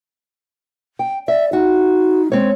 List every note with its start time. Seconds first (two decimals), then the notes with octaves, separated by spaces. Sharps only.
0.99 G5
1.28 D5 E5
1.53 D#4 F#4
2.32 G#3 C4 C#5